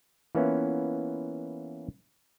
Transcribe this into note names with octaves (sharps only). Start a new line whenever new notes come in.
E3 A#3 B3 C#4 E4 F4